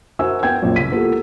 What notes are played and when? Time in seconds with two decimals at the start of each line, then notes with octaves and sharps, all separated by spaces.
0.19 F#4 A#4 C5 E5 G#5 E6
0.43 B3 G5 G#6
0.62 A#1 F#2
0.76 C#2 B6 D#7
0.92 A#3 B3 E4 F4 G4 A4